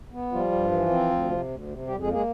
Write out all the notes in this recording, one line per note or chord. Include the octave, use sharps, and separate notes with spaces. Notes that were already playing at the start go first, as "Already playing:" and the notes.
B3
F3 G3 F4
G2
E3
C4
D2
C3
D2
C3
F2 G3 G4
G#3 G#4
A#3
G#3 G#4